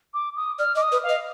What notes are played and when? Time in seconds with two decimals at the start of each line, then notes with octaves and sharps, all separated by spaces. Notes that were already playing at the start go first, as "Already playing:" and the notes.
0.14 D6
0.37 D#6
0.59 D5 F6
0.76 D#5 D6
0.82 D#6
0.92 B4
1.04 F5
1.09 D#5